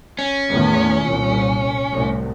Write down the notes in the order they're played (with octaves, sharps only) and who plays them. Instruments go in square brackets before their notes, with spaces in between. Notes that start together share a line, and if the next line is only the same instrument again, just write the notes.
[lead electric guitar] C#4
[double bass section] E2 A2 D#3
C2 A#2
C2 A2